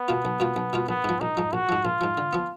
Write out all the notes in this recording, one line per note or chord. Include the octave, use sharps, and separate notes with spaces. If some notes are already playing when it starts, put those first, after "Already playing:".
Already playing: B3
B2 A#3 F4
B1
B2 A#3 F4
B1
B2 A#3 F4
A#1 B3
G#2 F3
A#1 D#4
G#2 F3
A#1 F#4
G#2 F3
A#1 F4
G#2 F3
D3
F3 B3